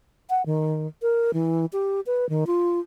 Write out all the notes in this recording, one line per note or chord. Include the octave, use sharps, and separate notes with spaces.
F#5
D#3
A#4
E3
G4
B4
D#3
F4